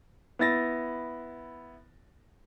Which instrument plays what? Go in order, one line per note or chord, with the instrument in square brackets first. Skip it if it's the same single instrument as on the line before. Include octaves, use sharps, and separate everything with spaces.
[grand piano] B3 E4 A6 A#6